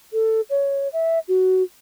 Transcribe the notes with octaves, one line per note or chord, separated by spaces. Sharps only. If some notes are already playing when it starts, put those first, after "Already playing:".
A4
C#5
E5
F#4